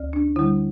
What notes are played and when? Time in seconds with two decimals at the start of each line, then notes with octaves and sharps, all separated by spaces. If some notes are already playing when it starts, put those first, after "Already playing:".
Already playing: D2
0.13 D4
0.36 D3 G3 E4